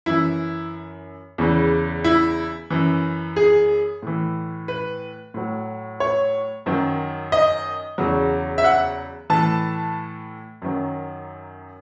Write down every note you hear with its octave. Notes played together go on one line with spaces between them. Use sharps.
F#2 E3 E4
E2 C#3 E3
E4
F#2 E3
G#4
A2 E3
B4
A2 F#3
C#5
F#2 D#3 F#3
D#5
E2 C#3 F#3
E5
F#5
A2 E3 A5
F#2 D#3 F#3